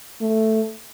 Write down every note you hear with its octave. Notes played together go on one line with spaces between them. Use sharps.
A3